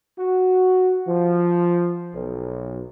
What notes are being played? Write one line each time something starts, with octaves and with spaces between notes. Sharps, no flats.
F#4
F3
B1